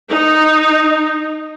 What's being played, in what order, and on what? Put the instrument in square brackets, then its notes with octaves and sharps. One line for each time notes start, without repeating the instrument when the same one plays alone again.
[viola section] D#4